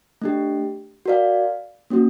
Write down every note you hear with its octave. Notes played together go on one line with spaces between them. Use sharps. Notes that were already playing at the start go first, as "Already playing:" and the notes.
A3 D4 G4
F#4 A#4 D5 F5
A#3 C#4 F#4